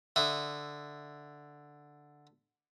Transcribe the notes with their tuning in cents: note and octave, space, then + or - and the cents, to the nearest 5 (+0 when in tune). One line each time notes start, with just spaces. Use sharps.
D3 +0 E5 +0 D#6 +0